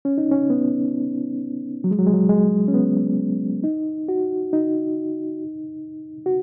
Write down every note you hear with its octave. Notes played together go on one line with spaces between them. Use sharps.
C#4
D#4
C#4
B3
F#3
G#3
F#3
G#3
F#3
G#3
C#4
B3
D#4
F#4
D#4
F#4